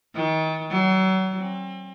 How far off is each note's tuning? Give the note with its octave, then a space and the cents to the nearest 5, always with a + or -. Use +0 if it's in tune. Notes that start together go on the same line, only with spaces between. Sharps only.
D#3 +35
F#3 +35
C4 +40